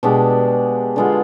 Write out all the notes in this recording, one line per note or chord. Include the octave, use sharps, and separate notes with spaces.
B2 G#3 D4 G4
D3 G#3 B3 F4